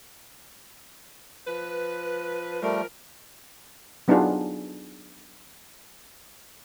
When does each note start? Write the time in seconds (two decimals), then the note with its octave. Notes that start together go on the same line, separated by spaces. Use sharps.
1.47 F3 B4
2.62 F3 G3 A3 A#4
4.08 F#3 B3 D4 D#4 F4 G#4